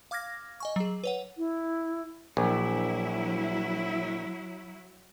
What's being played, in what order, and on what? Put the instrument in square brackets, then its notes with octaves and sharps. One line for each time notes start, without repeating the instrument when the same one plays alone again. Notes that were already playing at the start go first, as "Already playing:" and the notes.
[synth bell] F5 D6 F6 G#6 A#6
D#5 G#5 C#6
F#3 G#4
B4 C#5 F#5
[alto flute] E4
[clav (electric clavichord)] A#1 [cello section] F#3 E4